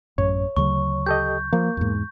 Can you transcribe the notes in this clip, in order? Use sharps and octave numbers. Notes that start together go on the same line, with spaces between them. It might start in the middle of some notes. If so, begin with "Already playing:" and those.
A1 F#2 C#5
D2 C#3 F#3 C#6
G4 A4 D#5 G6
F3 A#3
E2 G#2